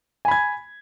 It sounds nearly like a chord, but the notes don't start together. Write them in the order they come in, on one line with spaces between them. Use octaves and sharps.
G#5 B5 G#6